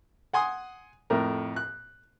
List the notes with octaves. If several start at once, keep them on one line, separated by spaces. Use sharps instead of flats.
F#5 G#5 C6 D#6
F2 A2 A#4
F#6